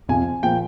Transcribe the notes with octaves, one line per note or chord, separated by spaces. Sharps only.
F2 C3 F3 G#5
A#2 F3 G5